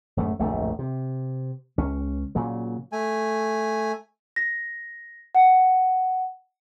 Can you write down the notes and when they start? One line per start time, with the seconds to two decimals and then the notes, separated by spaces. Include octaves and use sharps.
0.17 D1 F#2 G#3 A3
0.39 D1 A#1 F2 A3
0.79 C3
1.78 C#2 C#4
2.35 A#2 C#3 F#3
2.92 A3 G#5
4.36 A#6
5.35 F#5